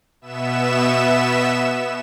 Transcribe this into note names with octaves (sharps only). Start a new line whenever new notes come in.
B2 B3 E5 E7